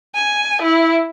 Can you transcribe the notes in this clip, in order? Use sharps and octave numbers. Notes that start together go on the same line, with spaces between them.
G#5
E4